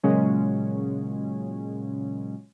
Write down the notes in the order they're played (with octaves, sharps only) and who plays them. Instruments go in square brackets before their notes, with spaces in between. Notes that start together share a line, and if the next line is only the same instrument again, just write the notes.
[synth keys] A#2 C#3 F#3 G#3 C#4